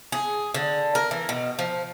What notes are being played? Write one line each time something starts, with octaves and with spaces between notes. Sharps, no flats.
G#4
D3
A#4
E3
B2
F3